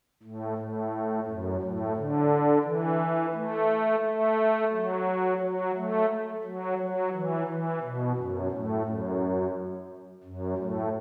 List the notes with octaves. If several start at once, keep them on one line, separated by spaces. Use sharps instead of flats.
A2
A2
F#2
A2
D3
E3
A3
A3
F#3
F#3
A3
F#3
F#3
E3
E3
B2
F#2
A2
F#2
F#2
A2